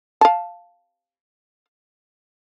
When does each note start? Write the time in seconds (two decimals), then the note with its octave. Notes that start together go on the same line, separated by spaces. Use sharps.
0.21 F5 A5